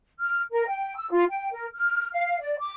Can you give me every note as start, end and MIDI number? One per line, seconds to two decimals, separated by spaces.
0.19 0.41 89
0.51 0.65 70
0.66 0.95 79
0.96 1.09 88
1.10 1.22 65
1.28 1.49 79
1.52 1.66 70
1.74 2.07 89
2.13 2.39 77
2.40 2.55 74
2.58 2.74 86